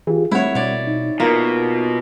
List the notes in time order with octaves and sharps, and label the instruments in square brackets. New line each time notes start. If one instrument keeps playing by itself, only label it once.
[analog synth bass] E3 [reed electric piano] F4 G4 G#4
[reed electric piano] G3 C4 F#5 [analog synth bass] A3 [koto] E4 C#5
[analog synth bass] B2 [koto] C#5 D5
[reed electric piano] D#4
[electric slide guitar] B2 [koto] A#3 [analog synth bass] F4